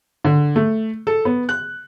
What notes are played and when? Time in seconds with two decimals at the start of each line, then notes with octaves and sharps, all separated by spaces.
0.25 D3
0.56 A3
1.07 A4
1.25 B3
1.49 F#6